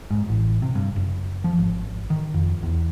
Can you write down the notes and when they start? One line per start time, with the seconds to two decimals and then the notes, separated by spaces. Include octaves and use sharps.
0.11 G#2
0.29 A1
0.62 C3
0.75 G2
0.96 F#1
1.44 F3
1.58 G#1
2.10 D#3
2.34 F2
2.63 E2